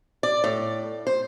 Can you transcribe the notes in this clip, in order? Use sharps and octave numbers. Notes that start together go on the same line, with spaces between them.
D5
A2
C5